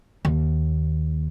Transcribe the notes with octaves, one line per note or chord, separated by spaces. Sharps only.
D#2